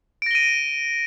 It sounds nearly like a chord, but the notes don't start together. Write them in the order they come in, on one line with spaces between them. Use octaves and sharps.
D7 A#6 G7 D#7